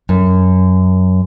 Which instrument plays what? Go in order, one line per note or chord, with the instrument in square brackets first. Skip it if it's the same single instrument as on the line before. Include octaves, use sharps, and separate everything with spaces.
[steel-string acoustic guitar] F#2